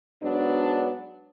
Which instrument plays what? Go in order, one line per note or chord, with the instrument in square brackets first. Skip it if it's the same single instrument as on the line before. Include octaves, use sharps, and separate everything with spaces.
[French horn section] G#2 F#3 B3 D4